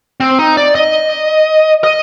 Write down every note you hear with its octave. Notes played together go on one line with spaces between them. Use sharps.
C4
D#4
D5
D#5
D#5